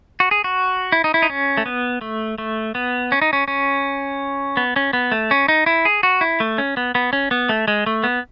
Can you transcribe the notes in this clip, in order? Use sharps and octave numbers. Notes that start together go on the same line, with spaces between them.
F#4
G#4
F#4
E4
D#4
E4
D#4
C#4
A3
B3
A3
A3
B3
C#4
D#4
C#4
C#4
B3
C#4
B3
A3
C#4
D#4
E4
G#4
F#4
E4
A3
C#4
B3
B3
C#4
B3
A3
G#3
A3
B3